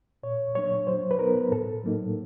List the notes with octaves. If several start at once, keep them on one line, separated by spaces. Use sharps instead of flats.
A#2 C#5
F#3 A#3 D4 C#5
F#3 C5
B4
B3 D#4 A#4
A2 A4
F#3 A#3 D#4